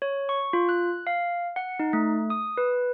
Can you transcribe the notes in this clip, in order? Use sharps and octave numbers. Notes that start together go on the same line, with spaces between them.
C#5
C#6
F4
F#6
F5
F#5
D#4
A3
D#6
B4